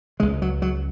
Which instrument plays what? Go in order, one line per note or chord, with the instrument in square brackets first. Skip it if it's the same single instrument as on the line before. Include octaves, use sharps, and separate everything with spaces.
[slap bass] C#3 G#3
C#2
F#3
F#3